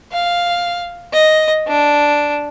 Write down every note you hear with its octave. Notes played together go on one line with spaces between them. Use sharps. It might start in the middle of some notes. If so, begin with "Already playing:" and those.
F5
D#5
D4